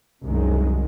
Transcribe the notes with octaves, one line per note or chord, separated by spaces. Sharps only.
C2 F#2 D#3 F#3 G#3